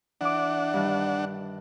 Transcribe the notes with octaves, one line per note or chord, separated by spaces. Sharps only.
E3 D4 F#5 D6
G2 D#3